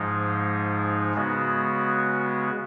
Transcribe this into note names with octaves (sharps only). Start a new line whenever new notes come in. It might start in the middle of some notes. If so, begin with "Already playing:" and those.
Already playing: G#2 F3 G#3 D#4
C#3 G#3 B3 F#4